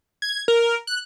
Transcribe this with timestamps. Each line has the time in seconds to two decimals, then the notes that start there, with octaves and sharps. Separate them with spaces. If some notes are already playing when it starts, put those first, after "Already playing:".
0.22 G#6
0.48 A#4
0.87 F#6